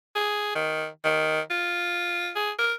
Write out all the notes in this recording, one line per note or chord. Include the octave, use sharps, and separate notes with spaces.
G#4
D#3
D#3
F4
G#4
A#4